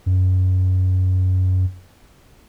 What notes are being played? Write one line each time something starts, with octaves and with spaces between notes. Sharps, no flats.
F#2